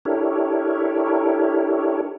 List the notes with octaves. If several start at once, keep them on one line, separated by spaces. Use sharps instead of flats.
D4 E4 G4 A4 A#4 C#5